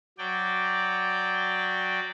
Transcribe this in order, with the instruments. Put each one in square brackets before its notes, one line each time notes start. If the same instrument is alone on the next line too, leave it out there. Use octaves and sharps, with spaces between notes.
[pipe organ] F#3 D5 G5